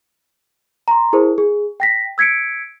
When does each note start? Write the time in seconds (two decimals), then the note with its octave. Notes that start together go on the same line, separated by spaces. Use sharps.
0.88 A#5 C6
1.13 E4 G#4 A#4 C5
1.38 G#4
1.80 G5 A#6 B6
2.18 E6 G#6 B6 C#7 D7